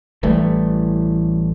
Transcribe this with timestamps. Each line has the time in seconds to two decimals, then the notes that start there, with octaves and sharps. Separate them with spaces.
0.23 A1 E3 G3 A3